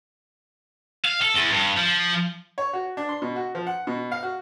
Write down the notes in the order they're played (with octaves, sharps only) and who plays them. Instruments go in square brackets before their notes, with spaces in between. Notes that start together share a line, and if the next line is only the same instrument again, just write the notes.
[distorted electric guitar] F5
A4
E2
G2
F3
[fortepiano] C#5
F#4
D4
C6
B2
F#4
F3
F#5
B2
F5
F#4